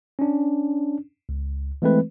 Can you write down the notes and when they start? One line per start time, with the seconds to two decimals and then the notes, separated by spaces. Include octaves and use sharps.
0.19 C#4 D4
1.29 C#2
1.82 E3 G#3 A3 C4 B4